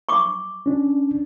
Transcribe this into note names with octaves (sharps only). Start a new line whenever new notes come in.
C#6 D6
C#4 D4